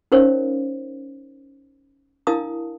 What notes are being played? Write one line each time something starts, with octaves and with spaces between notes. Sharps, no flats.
C#4 D#4 A#4 C5 C#5 F5
D4 E4 A#4 F5 A5 D#6